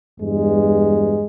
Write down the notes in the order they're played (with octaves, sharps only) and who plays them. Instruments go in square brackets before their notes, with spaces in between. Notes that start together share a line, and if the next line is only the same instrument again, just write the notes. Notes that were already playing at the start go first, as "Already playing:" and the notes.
[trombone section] E2 G2 G#3